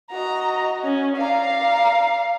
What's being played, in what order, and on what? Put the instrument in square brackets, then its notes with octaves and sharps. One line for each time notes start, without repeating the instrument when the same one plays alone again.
[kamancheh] F#4 D#5 [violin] A#5
[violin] C#4
[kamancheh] D5 A#5 [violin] F5